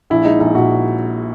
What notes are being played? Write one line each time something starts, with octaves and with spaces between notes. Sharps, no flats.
A#1 E4
G#3 D#4
A#1 D#4
A#2 F#4